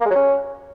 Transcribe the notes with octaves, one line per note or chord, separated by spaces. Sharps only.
A#3
G#3
F#3
C#4